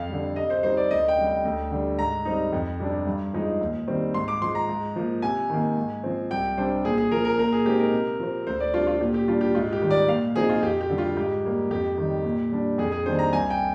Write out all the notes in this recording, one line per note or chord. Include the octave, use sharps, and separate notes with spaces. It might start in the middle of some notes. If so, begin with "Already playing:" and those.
Already playing: F2 F5
D3 G3
C3 D#5
C5
G3 C4 D#4 C5
D5
D2 D#5
G5
C3 G3
G5
D2
D3 G3
G#2 A#5
G3 C4 D#4
F2
C3 G3 D4
G2
F3 G#3 D#4
D#2
D#3 G3 C4
G#2 C6
D6
F3 G#3 C6
A#5
G#2
F3 A#3
C3 G#5
D#3 A#3
G#2
F3 C4
C2 G5
C3 G3 D4 C5
A#2 G#4
G#4
F3 A#3 A#4
A#4
A#2 A#4
G#4
G#3 C4 D#4 G4
A#4
C3
F3 C4
D2 C5
D5
C3 G3 D4 F4
F4
A#2 G4
G4
G3 D4 F4
G4
G#2 F4
G4
D#3 G3
D5
A#2 F5
F3 C4 D#4 G#4
F4
F2 G4
G4
D3 G3
F4
G#2 G4
G3 A#3
F2 G4
D#3 G3
A#2
G3 D4
F2 G#4
G#4
D#3 G3 A#3 D4 C5
A#5
C2 G#5
G5